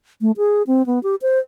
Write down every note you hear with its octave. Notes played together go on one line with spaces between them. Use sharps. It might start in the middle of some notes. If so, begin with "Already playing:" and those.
A3
G#4
C4
B3
G4
C5